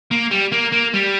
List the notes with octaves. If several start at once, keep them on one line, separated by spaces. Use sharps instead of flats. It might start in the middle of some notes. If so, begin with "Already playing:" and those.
A#3
G3
A#3
A#3
G3